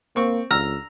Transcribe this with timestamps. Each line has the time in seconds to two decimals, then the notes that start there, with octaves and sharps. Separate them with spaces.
0.16 A#3 C4 C#6
0.51 C#2 A#5 E6 F6